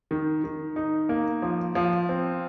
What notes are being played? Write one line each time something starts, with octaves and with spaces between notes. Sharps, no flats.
D#3
D#3
D#4
A#3
F3
F3
C4